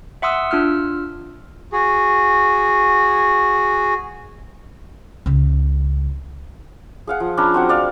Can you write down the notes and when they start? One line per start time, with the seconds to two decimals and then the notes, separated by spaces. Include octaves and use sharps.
0.22 E5 F#5 C6 D#6 E6
0.51 D4 F4 E6 F6
1.73 F#4 G#4
5.26 C#2 C#3
7.07 G#4 F5 F#5
7.20 F3
7.37 C#4 D4 A#5 B5
7.54 C4 F#4 F#5
7.69 D5 F5